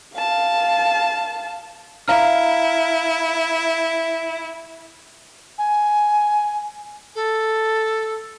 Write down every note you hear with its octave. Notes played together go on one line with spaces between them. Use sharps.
F5 A5
E4 F5 A#5 F6
G#5
A4